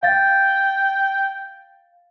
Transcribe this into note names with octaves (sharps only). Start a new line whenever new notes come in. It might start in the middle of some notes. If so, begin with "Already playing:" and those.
F5 G5 A6